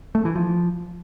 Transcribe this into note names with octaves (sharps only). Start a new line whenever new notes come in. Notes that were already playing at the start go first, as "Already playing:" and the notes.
A3
E3
F3